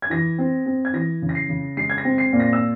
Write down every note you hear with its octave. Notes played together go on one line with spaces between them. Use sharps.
G#6
E3 A#6
C4
C4
G#6
E3 A#6
C#3
A#6
C7
C#3
G#3 C7
G#6
A#6
C4
C7
A#2
A#6
E6